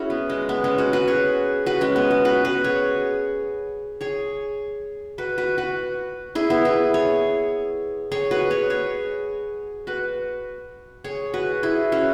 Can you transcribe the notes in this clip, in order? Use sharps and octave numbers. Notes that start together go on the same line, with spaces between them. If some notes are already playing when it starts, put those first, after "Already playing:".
Already playing: C#4 E4 F#4 G#4
B3
G#3
B3
G#3 C#4
C#4 F#4
F#4 B4
G#4 C#5
F#4 B4
G#3 C#4
B3
G#3
F#4 B4
F#4 B4
G#4 C#5
G#4 C#5
F#4 B4
F#4 B4
F#4 B4
E4 G#4
B3 E4
E4 G#4
G#4 C#5
G#4 C#5
F#4 B4
G#4 C#5
G#4 C#5
F#4 B4
G#4 C#5
F#4 B4
E4 G#4
C#4 F#4